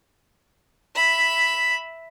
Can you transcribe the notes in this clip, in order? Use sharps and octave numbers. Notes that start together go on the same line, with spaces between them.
E5 B5